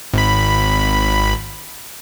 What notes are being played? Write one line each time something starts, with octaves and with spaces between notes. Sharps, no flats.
G#1 B5